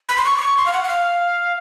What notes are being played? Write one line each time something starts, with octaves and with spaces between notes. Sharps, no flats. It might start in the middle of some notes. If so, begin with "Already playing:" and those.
B5
C6
C#6
D6
C#6
C6
F5
F#5
F#5
F5